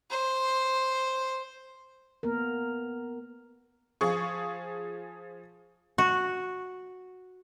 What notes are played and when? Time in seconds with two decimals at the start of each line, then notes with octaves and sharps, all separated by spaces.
0.11 C5
2.23 A#3 B3 A#4
4.01 F3 G#4 C#6
5.98 F#4